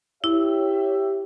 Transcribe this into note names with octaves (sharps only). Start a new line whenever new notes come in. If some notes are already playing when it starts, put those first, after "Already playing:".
E4 G4 C#5 E5